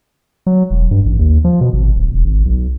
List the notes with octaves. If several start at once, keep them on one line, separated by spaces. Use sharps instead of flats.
F#3
E1
G2
A1
D#2
F3
B2
G#1
D1
E1
G#1
B1